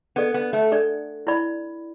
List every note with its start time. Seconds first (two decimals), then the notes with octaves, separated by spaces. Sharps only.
0.16 B3 D4 A4 D5
0.34 B3
0.53 A3
0.72 D4 A4 D5
1.27 E4 D5 B5